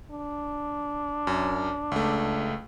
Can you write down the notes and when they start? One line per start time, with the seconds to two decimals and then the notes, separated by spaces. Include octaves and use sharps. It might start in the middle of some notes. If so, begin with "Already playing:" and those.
0.11 D4
1.27 F#2
1.92 C#2 A3